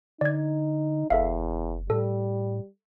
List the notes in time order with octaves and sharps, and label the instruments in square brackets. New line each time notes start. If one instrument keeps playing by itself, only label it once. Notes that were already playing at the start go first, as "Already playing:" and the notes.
[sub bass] D3 [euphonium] D#4 [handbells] D5 G#6
[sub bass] F#1 [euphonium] E2 [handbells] A4 E5 F5
[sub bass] A2 [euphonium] G3 [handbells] A4